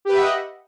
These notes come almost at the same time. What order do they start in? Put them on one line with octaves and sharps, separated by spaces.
G4 B4 E5 F#5 D#5